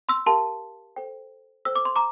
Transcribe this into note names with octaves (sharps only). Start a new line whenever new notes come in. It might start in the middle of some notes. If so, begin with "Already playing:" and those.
C6 E6
G4 A#4 F5 A5 C6
A4 C5 G5
A4 C5 G5 E6
D6
C6
A#5 D6